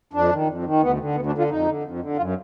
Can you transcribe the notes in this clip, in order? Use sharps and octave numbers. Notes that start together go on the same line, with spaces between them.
F2 D4
D#3
F2
D#3
D2 B3
D3
D2 B3
D4
D3
F4
F2 D#4
D3
F2
D3
F#2 F4